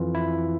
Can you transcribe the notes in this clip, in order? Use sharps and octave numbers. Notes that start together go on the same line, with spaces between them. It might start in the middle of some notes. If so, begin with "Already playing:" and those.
Already playing: F2 E3 F4
E4